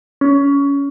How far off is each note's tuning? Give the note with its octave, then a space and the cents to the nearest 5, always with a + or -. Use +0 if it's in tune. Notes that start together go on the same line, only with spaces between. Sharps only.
C#4 +20